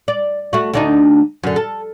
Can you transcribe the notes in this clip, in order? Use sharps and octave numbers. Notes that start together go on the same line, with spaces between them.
D5
A3 F#4
D2 D4 D#4
F#2 D3
A4